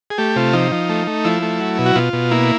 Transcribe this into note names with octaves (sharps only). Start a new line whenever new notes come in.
G#4
A3 G4
C3 F4
F3 D#4
F3
A3
A3
F3 E4
A3
F#3
B2
F#4
B2 F4
B2
A#3 E4